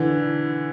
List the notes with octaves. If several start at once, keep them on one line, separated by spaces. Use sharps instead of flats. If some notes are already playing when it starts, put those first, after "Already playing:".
Already playing: D3 E3